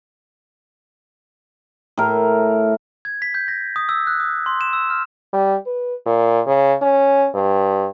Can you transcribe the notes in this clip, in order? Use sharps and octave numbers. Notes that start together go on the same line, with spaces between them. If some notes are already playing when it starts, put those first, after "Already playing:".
A2 A#4
G#6
B6
G6
A#6
D#6
E6
F#6
D#6
C6
E7
E6
F6
G3
B4
A#2
C#3
C#4
G2